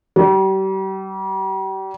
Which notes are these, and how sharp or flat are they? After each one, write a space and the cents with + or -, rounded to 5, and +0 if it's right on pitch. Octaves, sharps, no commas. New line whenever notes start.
G3 -35